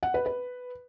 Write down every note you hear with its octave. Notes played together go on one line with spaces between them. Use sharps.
F#5
B4
B4